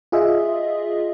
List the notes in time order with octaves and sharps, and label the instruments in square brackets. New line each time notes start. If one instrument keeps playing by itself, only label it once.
[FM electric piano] F4 G#4 D#5 E5